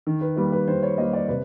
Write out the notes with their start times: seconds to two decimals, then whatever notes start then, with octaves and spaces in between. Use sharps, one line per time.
0.07 D#3
0.21 B4
0.36 G3 A#3 B4
0.52 B4
0.67 D#3 C5
0.83 C#5
0.98 G3 A#3 D#5
1.13 D5
1.28 C3 B4